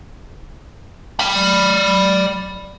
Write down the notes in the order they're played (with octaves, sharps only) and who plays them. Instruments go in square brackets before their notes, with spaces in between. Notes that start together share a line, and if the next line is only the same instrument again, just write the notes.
[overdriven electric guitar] D5 B5